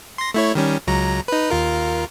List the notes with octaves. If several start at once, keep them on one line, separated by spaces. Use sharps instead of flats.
C6 A#6
A3 E4 C#5
D#3 G3 C#4
C#2 F#3 A#5
D#4 B4
D#2 F4 A#4